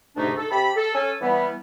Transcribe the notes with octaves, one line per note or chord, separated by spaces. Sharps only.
D2 G#2 C3 A3 D4 D#4
A4
C3 G4 A5 B5
A4
C#4 A4 G#5
E3 G3 B3